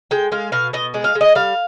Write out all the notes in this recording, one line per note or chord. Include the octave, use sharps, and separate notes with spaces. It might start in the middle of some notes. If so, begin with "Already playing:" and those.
G#3 G5
G#3 F5
B2 F5
B2 D#5
G#3
F5
G#3
D#5
G3 F5